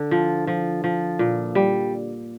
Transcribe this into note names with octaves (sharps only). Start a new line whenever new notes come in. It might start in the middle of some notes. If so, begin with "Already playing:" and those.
Already playing: D3
F3
F3
F3
A#2
G3